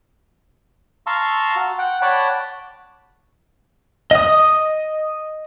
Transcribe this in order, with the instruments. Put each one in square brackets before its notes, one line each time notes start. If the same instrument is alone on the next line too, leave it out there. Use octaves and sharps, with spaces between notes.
[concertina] F5 A5 A#5 C6 C#6 E6
F#4
F#5 G5
C#5 D5 F#5 G5 A5 B5
[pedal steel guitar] D#5 D#6